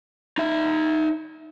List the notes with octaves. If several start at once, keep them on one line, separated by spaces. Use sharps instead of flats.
D#4 E5